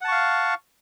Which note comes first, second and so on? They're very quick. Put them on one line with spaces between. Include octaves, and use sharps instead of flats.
F#5 A5 C#6 F5